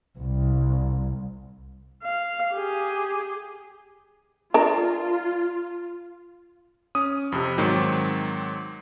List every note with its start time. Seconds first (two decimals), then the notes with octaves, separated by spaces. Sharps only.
0.19 C2
2.03 F5
2.53 G4 G#4
4.54 D4 F4 A#4
6.95 C#4 D#6
7.32 F2 C3
7.58 G#2 D#3 F#3 C4